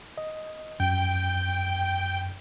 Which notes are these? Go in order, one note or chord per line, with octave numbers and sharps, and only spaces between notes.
D#5
F#2 G5